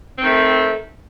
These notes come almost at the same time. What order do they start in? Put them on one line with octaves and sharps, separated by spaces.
C4 D#3 A3